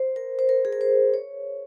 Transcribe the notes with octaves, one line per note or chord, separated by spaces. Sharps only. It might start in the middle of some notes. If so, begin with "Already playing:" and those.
Already playing: C5
A#4
C5
A#4
G#4
A#4
C5
C#5